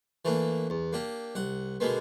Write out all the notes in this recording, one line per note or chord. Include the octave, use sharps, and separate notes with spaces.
E3 A3 A#3 D4
E2
A#3 D4 G4
C2 F#5
B2 D3 G#3 A#3 B3